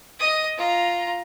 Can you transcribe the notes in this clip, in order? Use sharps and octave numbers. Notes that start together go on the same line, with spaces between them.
D#5 D#6
F4 A#5